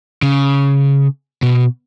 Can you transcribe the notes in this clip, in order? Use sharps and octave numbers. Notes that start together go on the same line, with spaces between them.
C#3
B2